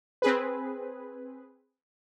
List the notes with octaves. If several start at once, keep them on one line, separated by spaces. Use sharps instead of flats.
C4 G#4 B4